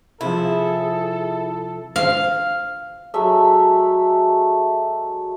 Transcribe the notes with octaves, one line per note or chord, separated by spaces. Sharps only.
C3 F3 E4 G#4 A4
F5
F#3 G#3 A3 E5